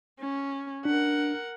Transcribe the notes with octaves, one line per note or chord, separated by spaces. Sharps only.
C#4
D4 A#4 F#5